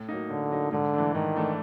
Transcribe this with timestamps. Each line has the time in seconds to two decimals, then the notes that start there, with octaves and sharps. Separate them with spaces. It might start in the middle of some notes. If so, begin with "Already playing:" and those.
Already playing: A2
0.08 F#3 A#3 D#4
0.30 A2 D3
0.51 F#3 A#3 D#4
0.72 G#2 D3
0.94 E3 A3 D4
1.14 G#2 D#3
1.36 E3 A3 D4